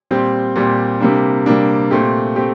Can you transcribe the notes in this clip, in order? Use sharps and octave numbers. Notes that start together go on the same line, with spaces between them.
A#2 G3 C4 G4
A#2 G3 C4 G4
C3 G3 A#3 D4
C3 G3 A#3 D4
A#2 A3 C4 G4
A3 C4 G4